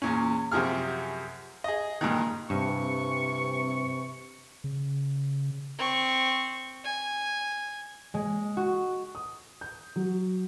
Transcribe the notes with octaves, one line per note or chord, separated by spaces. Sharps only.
E2 A#2 C#4
F#2 C3 F3 G#4 F6
G#4 D#5
G2 A#2 D#3
G2 C3 E3 C#6
C#3
C4 C#6
G#5
G#3
F#4
D#6
G6
F#3